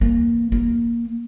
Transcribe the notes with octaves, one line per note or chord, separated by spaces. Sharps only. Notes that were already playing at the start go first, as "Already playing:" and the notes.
E3 A#3
A#3